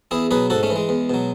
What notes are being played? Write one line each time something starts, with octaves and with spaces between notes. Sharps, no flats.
E2 E4 G#4
B2 F#3 G#4 B4
G#2 F#4 A4
A3 C#4
E3
G#3
E2
B2 F#3